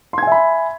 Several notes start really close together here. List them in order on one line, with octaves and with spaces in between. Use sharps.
C6 G#6 G#5 E5 B5